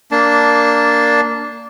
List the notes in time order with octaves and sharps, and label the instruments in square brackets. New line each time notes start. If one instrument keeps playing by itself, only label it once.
[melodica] A#3 D4 A5